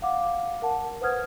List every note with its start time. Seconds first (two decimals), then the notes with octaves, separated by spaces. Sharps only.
0.02 F5 F#5 D6
0.62 A#4 F#5 A5
1.01 B4 C5 F#5 D#6 F6 G#6